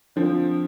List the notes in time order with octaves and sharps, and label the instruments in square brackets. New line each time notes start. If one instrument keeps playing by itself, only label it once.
[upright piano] D3 F3 C4